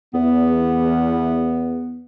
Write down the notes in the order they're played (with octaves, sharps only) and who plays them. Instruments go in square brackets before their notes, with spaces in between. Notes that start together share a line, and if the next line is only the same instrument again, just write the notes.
[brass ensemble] E2 [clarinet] B3